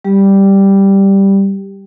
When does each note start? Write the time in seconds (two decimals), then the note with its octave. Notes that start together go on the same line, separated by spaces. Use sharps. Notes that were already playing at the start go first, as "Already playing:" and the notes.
0.05 G3 G4